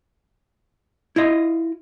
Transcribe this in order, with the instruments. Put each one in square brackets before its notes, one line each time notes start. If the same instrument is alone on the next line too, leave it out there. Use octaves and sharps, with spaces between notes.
[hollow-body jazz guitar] E4 F4 D#5